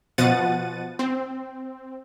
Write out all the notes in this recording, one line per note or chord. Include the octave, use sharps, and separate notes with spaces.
B2 F3 F#5 A6 D#7
C4